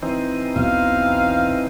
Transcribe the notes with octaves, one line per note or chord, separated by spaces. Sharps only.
E3 C4 D#4
B1 E2 B2 F5